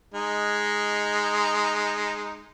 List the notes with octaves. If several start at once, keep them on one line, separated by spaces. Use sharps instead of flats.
G#3 D#4